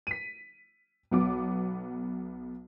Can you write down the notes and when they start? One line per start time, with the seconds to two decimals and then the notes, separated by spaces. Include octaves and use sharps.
0.07 B6 D#7
1.11 B1 B3 D6